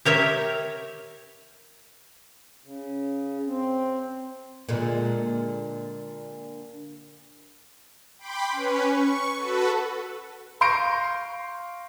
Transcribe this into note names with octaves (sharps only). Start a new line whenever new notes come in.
G4 A#4 C#5 E5
C#3
C4
A#2 D3 G#3
G5 B5 C6 D6
C#4 B4
C#6
F#4 A4 B4
F5 C6 C#6 G6 A#6 D7